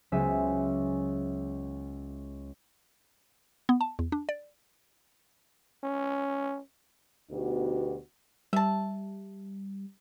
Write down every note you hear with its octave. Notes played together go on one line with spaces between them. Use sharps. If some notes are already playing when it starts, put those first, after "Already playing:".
C#2 F#3 B3 C5 E5 G#5
B3
A5
E2
D4
D5
C#4
D2 B2 B3 D#4 F#4 G4
G3 E5 A5